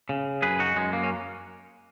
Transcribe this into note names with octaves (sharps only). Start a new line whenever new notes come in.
C#3
F#2 G#4 B4
D#4 F#4
F#2 G#3
A#3
C#4